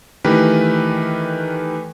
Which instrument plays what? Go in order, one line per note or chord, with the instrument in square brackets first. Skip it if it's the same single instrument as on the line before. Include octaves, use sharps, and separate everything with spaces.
[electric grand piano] D#3 E3 A3 G4 A#4 B4